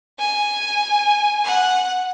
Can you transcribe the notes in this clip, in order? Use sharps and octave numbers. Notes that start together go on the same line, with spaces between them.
G#5
F#5